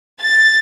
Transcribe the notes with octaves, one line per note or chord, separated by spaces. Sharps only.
A6